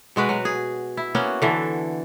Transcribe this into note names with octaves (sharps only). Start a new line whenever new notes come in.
B2 G#3 F#4 B4
F#3
G#4
E4
A#3 B3 C#4 F#4
D3 E3 A4